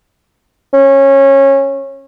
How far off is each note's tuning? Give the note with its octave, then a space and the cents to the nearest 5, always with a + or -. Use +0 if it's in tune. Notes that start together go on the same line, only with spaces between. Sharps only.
C#4 -20